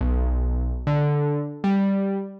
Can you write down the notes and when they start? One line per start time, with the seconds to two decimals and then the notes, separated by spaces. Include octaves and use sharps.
0.01 B1
0.87 D3
1.64 G3